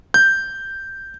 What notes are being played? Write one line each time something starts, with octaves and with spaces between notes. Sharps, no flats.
G6